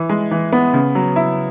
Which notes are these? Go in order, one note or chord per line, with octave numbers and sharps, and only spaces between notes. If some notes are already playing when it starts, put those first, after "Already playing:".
Already playing: E3
G#3
E3
B3
C#3
F#3
E4